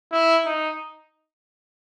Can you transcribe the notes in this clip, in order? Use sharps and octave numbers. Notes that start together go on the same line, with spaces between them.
E4
D#4